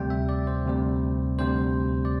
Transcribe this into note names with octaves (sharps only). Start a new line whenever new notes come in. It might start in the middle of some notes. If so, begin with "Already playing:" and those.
Already playing: D2 C3 G3 G5
E5
D5
C5
D2 C3 G3
D2 C3 G3 C5
D5